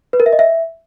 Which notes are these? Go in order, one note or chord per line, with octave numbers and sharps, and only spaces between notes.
B4
A#4
E5
D#5
E5